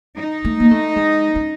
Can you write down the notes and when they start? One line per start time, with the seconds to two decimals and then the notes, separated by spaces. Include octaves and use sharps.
0.19 D#4
0.45 A3
0.60 A#3
0.71 A3
0.96 G#3
1.35 C#4